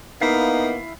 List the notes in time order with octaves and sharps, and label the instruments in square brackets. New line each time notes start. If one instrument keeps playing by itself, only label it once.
[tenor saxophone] A#3 [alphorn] B3 [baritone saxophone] D#4 [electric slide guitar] E4 E5 F5